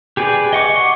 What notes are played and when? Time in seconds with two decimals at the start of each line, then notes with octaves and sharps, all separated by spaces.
0.17 G4 G#4 B4 D5
0.53 D#5 F#5 C#6 D6